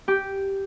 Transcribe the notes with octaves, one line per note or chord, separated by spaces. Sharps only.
G4